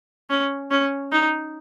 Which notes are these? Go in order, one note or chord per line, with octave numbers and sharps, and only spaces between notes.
C#4
C#4
D#4